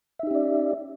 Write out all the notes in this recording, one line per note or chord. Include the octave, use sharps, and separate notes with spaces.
C#4 D#4 G4 D5 E5